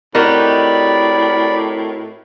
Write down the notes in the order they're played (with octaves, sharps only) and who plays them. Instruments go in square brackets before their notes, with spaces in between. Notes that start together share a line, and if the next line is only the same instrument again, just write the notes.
[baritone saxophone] A2 [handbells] C4 A#4 [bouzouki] D#4 F#4 G4 [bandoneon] D5 B5